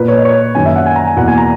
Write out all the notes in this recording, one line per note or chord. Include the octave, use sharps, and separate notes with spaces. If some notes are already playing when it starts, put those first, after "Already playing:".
Already playing: A#2 A#3 B4
C#5
D#5
C#5
F#2 D#3 A#3 G#5
E5
F#5
G#5
A#5
G#5
E2 B2 A#3 F#5
G#5
A#5